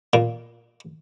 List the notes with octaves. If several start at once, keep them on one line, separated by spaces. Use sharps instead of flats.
A#2